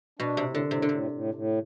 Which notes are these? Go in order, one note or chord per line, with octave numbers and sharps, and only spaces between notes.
B2 D4
C3
A2
D3
A2
C3
D3
A2 C3
A2
A2